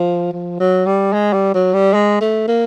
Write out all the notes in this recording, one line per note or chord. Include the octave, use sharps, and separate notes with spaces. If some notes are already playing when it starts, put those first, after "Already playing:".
Already playing: F3
F3
F#3
G3
G#3
G3
F#3
G3
G#3
A3
A#3